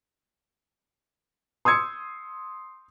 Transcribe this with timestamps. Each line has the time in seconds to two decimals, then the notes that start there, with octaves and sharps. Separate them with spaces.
1.65 C6 D#6 E6 G#6 C#7